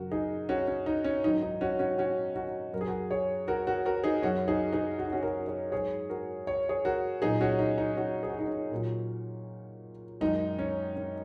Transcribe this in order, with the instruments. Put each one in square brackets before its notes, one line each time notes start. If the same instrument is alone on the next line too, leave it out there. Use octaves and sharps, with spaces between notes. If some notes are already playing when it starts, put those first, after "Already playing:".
Already playing: [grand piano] F#2 C#3 F#3 F#4 A#4
D#4 G#4
C#4 F#4
C#4
D#4
C#4
G#2 D#3 F#3 D#4
D#4
C#4 F#4
C#4 F#4
C#4 F#4
C#4 F#4
F#2 F#3 A#4
G#4
F#4 A#4
G#4 C#5
F#4 A#4
F#4 A#4
F#4 A#4
D#4 G#4
F#2 F#3 C#4 F#4
D#4 G#4
D#4 G#4
F#4
D#4
C#4 F#4
F#4 A#4
G#4 C#5
G#2 F#3 G#4 C#5
F#4 A#4
C#5
G#4 C#5
F#4 A#4
A#2 F#3 D#4 G#4
C#4 F#4
D#4
D#4
C#4 F#4
G#4
F#4
D#4
C#4
A#2 F#3
F#2 D#3 G#3 D#4
C#4
C#4